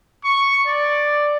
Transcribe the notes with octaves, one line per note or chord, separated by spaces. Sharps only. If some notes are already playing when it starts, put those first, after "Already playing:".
C#6
D5